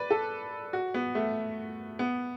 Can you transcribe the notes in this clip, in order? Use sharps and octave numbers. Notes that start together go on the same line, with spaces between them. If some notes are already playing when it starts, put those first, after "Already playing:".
Already playing: B4 D5
A4
F#4
B3
A3
B3